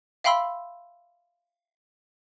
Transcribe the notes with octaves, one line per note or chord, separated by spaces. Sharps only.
E5 F5 G5 B5 C6 E6